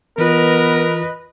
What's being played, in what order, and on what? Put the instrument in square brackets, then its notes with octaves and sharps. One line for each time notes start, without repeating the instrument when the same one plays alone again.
[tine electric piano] E3 F4 [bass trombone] B3 [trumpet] A#4 [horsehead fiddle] B4 D#5